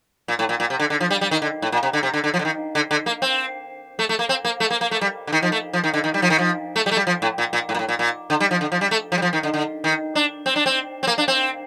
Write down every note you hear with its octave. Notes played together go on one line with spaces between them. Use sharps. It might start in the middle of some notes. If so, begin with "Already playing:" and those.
A#2
A2
A#2
A#2
C3
D3
D3
F3
G3
G3
D#3
D3
A2
A#2
C3
D3
C3
D3
D3
F3
D3
D#3
D3
D3
A#3
C4
A3
A3
A#3
C4
A#3
A3
A#3
A#3
A3
G3
D3
D#3
F3
A3
F3
D#3
D3
D#3
G3
F3
D#3
F3
A3
G3
A3
G3
F3
A2
A#2
A#2
A2
A#2
A2
A#2
A#2
D3
G3
F3
D3
F3
G3
A3
F3
G3
F3
D#3
D3
D3
D#3
D4
C4
D4
C4
C4
A#3
D4
C4